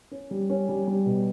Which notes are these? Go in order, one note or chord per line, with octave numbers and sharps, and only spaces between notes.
C#4
G3
C#4
G3
G3
B2